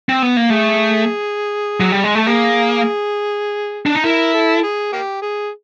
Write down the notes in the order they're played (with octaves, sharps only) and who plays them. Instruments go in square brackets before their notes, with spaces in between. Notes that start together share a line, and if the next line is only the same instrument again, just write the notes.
[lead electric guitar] C4
B3
A#3
[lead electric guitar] A3 [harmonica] G#4
[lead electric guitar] F#3
G3
G#3
[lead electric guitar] A3 [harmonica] A4
[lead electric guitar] A#3 [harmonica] G#4
[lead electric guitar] D4
D#4
[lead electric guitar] E4 [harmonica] A#4
[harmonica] A4
G#4
A#3 G4
G#4